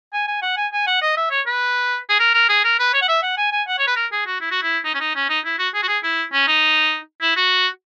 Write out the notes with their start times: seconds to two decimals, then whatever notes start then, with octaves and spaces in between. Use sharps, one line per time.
0.13 G#5
0.28 G#5
0.42 F#5
0.57 G#5
0.73 G#5
0.87 F#5
1.02 D#5
1.17 E5
1.31 C#5
1.46 B4
2.09 G#4
2.19 A#4
2.34 A#4
2.49 G#4
2.64 A#4
2.79 B4
2.94 C#5
3.02 F#5
3.09 E5
3.23 F#5
3.37 G#5
3.52 G#5
3.68 F#5
3.79 C#5
3.87 B4
3.96 A#4
4.12 G#4
4.26 F#4
4.41 E4
4.51 F#4
4.62 E4
4.85 D#4
4.94 C#4
5.00 D#4
5.15 C#4
5.29 D#4
5.45 E4
5.58 F#4
5.74 G#4
5.83 F#4
5.88 G#4
6.03 E4
6.33 C#4
6.47 D#4
7.21 E4
7.36 F#4